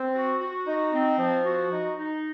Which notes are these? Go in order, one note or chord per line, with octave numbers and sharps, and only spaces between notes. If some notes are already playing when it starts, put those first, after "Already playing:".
Already playing: C4
F#4
F#4
D#4
C4
F3
F#4
D#4
D#4